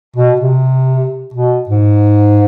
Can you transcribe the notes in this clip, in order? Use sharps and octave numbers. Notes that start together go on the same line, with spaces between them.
B2
C3
B2
G#2